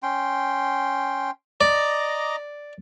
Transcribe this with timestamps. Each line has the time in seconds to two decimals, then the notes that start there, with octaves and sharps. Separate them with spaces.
0.03 C#4 G5 C6
1.61 D5 D#5 A#5 D6